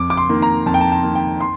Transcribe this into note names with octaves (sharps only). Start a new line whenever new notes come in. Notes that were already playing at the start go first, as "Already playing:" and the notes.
Already playing: F2 D6
D6
C6
D#3 A#3
A#5
F2 A5
G5
A5
A5
D#3 A#3
G5
C6